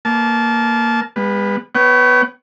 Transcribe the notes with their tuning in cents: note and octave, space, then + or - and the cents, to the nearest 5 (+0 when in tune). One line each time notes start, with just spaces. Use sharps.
A#3 +0 A5 -25
G#3 -45 B3 -5
B3 +0 C#5 +0 G5 -45